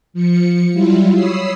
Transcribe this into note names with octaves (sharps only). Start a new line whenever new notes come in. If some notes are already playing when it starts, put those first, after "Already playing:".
F3 C#7
F#3 G3 E4 F4
C#5 B5 D#6 E6 C7